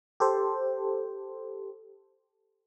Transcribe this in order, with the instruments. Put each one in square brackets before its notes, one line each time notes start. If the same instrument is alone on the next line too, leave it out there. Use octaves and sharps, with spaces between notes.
[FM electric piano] G4 A4 C5